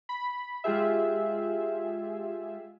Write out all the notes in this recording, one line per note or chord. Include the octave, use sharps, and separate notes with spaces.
B5
G#3 F4 G4 G#4 E5